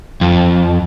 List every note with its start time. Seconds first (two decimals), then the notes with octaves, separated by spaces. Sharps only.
0.21 F2